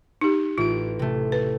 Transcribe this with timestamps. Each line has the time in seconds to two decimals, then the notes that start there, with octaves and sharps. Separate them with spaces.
0.21 D#4 G4
0.58 A1 F4 D7
0.99 C3 A3
1.32 B4